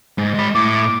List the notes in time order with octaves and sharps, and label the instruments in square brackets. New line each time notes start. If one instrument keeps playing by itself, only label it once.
[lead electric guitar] G#2
G#3 B5
[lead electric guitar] A2 [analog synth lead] D6